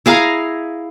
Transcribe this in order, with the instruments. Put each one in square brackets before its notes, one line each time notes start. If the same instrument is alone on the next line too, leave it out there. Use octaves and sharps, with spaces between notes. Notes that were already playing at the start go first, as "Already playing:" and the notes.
[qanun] E4 G#4 F5 A#5